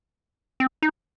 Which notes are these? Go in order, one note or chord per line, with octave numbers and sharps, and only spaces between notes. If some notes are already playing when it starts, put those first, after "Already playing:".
C4
D#4